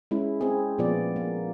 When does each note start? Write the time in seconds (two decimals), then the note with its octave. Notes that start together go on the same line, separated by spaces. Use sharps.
0.11 G#3 C#4 E4
0.41 C4 G#4
0.78 A#2 F3 B3 D5
1.16 A#3